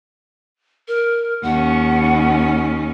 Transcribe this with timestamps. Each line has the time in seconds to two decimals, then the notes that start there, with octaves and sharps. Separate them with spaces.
0.88 A#4
1.43 D#2 C#4 F#5